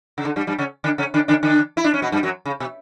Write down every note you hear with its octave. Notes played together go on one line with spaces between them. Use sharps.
C#3
D3
G2 G3
G2 G3
C#3 C#4
D3 D4
C#3 C#4
D3 D4
D3 D4
D3 D4
E4
D4
C#4
B2 B3
G2 G3
F#2 F#3
C#3
B2